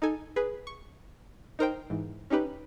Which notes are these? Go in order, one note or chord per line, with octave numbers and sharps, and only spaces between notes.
D#4 A4 G#5
G#4 B4
C#6
D#4 A#4 C5 G5
G#2 E3
C#4 D#4 G4 B4